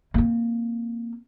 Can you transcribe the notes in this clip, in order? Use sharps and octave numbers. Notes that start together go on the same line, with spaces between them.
A#3 C4